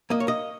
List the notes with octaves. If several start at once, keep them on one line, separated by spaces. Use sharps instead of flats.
A#3 D#5
C#5
D#5